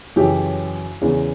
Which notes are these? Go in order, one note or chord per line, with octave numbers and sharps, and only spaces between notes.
F#2 C#3 E3 G4
E2 C#3 E3